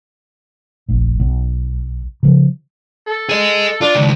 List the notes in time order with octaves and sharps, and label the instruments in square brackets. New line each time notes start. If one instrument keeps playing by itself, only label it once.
[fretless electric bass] F1 A#1
B1
C#3 F3
[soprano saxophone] A4
[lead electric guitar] G#4 D#5
[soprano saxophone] D4 [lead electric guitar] F4
[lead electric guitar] C#2 D#3